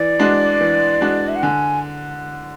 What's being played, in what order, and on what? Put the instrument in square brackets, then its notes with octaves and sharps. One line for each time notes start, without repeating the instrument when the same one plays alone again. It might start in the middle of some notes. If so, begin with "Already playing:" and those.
Already playing: [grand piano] E3 [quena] D5
[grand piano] G#3 D4 F#4
E3
G#3 D4 F#4
[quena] E5
F#5
[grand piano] D3 [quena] G#5